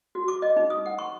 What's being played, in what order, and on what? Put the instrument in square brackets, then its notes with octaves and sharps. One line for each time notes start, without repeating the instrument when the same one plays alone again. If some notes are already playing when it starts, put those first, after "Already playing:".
[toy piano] F#4
D6
D#5
D#4
D#6
F#5
C#6